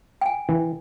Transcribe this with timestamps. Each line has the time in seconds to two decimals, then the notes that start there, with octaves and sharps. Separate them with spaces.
0.21 G5 G#5
0.49 E3